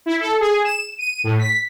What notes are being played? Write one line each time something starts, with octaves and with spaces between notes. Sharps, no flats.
E4
A4
G#4
E7
D#7
A2
B6